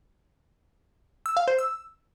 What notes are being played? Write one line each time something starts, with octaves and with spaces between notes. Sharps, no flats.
E6
F5
C5
E6